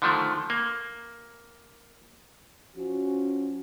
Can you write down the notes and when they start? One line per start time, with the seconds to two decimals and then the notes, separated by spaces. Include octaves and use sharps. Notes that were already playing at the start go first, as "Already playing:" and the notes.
0.02 D3 D#3 F3 A3
0.50 A#3
2.76 F3 C#4 F#4